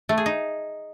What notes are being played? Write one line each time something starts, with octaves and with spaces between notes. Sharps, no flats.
A3
G#4
D#4